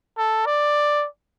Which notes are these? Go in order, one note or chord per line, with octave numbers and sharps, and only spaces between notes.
A4
D5